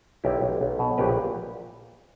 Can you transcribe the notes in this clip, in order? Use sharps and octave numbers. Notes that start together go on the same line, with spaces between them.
B1 E4 G4
B1
B1
B2
A#1 G4 B4
A#2